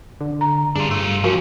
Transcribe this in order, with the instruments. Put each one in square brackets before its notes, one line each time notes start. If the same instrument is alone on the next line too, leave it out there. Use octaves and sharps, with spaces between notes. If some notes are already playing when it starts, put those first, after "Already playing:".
[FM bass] D3
[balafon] A#5
[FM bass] G2 [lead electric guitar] D4 F4 [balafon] G#4
[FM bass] G2 [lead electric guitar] A3 F4
[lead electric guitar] D#2 C#4 [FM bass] F3 [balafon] F#4 A#4